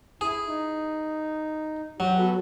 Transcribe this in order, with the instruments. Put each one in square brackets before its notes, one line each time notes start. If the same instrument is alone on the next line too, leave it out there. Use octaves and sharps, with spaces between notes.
[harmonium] E4 [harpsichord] G#4
[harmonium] D#4
[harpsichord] F#3 [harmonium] F#4 G4
[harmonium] B3 A4 B4 [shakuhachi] F#4